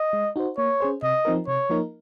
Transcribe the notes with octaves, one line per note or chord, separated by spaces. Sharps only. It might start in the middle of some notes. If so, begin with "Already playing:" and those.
Already playing: D#5
G#3
D#4 F#4 C5
A#3 C#5
C#4 G#4 C5
C3 D#5
F3 C4 D#4 A#4
C3 C#5
F3 A#3 D#4 A#4